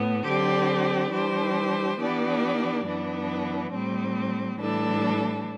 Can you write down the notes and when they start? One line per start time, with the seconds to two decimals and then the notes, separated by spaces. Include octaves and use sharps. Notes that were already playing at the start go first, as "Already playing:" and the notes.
Already playing: A2 B3
0.25 D3 F#3 C4 G4 D5
1.12 E3 G3 D4 G4 C5
1.99 E3 B3 D4 G4 D5
2.86 F#2 E3 B3 D4
3.74 A2 G3 C4
4.60 A2 E3 G3 D4 A4